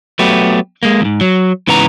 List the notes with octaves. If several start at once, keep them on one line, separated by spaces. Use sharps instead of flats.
F#3 A3 B3 G4
G#3 A#3
E2 G#2
F#3
G#2 C#3 E3 B3 A#5